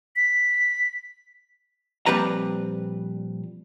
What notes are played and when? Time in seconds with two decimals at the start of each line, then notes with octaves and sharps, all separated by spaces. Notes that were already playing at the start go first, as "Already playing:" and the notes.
0.16 B6
2.06 A#2 F3 G3 C4 B4 A#5